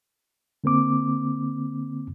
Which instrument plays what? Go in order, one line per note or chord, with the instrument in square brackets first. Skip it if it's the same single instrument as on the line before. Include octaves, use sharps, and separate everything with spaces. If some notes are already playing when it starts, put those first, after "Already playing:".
[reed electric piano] D3 A#3 C4 D6